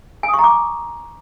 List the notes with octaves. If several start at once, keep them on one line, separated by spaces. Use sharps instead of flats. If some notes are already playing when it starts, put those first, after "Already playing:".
G#5
D#6
C#6
A#5
D6